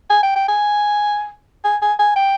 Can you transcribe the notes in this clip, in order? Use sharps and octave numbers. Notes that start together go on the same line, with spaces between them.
G#5
G5
G5
G#5
G#5
G#5
G#5
G5